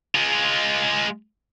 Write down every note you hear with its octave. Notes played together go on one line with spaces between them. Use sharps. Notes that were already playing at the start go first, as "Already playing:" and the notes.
G#3 F4